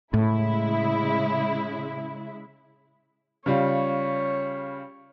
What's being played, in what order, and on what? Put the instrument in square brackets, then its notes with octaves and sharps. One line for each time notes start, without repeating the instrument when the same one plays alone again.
[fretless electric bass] A2 [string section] C#3 G#3 E4
[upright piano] C#3 G3 F4 [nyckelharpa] C#5